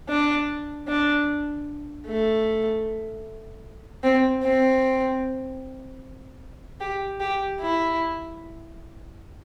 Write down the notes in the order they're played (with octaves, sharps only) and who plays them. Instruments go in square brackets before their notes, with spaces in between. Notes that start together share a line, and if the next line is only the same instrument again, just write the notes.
[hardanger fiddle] D4
D4
A3
C4
C4
G4
G4
E4